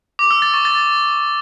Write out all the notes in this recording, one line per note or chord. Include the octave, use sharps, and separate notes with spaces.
D6
E6
A6
C#6
A6